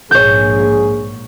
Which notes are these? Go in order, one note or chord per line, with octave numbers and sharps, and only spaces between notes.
A#1 G#2 G#4 C#5 G6